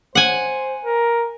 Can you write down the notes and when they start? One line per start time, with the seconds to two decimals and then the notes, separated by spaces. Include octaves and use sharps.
0.15 C5 F#5 G#5
0.85 A#4